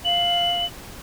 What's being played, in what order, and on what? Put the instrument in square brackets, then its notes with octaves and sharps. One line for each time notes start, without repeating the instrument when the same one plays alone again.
[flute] F5 [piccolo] F#7